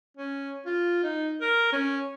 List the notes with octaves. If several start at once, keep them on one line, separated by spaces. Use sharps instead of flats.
C#4
F4
D#4
A#4
C#4